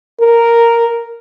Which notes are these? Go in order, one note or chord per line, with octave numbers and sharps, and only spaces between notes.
A#4